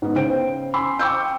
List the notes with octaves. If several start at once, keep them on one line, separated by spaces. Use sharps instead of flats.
G#2 B3
C#3 C5 G5 D7
G#5 B5 C6 E6
G5 C#6 D6 E6 G6